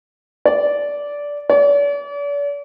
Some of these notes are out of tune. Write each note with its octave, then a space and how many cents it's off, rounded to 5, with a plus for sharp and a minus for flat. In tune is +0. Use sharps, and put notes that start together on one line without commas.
D5 -15
D5 -45